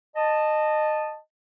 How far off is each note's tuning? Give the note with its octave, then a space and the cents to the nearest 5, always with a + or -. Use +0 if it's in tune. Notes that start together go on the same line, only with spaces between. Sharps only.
D#5 -20 A5 +0